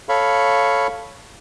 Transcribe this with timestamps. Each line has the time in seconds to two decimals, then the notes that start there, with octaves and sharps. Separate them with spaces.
0.09 A4 C#5 F5 B5 C#6